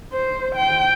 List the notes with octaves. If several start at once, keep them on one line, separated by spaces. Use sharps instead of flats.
C5
G5